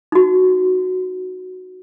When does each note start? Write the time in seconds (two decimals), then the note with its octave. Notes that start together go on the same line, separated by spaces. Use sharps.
0.12 D#4 F#4